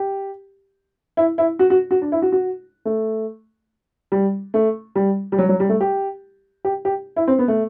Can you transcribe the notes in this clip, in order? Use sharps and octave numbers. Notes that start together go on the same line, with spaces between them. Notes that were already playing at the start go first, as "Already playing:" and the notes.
Already playing: G4
E4
E4
F#4
F#4
F#4
D4
E4
F#4
F#4
A3
G3
A3
G3
G3
F#3
F#3
G3
A3
G4
G4
G4
E4
C4
B3
A3